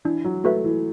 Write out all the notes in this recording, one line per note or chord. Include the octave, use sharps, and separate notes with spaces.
E3 D4
F#3
A3 F#4 B4 E5
E3